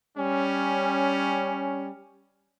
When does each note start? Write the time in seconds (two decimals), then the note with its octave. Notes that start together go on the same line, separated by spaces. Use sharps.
0.16 G3 C#4